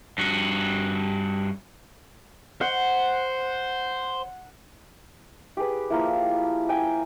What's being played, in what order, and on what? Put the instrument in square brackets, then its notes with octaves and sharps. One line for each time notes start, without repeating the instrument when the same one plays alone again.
[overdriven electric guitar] G2 F#4
[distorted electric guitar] C5 [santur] F#5
[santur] G4 G#4 B4
F3 A#3 E4
G5 G#5